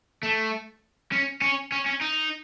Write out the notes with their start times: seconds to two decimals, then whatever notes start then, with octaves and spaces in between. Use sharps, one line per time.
0.23 A3
1.12 C#4
1.41 C#4
1.72 C#4
1.86 C#4
2.01 D#4